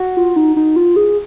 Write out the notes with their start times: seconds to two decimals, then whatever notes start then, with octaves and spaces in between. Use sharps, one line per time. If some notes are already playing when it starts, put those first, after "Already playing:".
Already playing: F#4
0.17 F4
0.36 D#4
0.56 D#4
0.76 F4
0.96 G#4